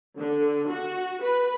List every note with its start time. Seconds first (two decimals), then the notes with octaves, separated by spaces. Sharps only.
0.18 D3
0.69 F#4
1.24 B4